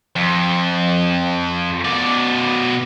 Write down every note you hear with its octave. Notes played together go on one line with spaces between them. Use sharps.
F2
B2 D5